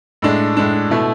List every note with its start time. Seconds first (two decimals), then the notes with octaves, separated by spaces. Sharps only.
0.22 A2 G#3 D4
0.57 A2 G#3 D4
0.90 B2 A3 E4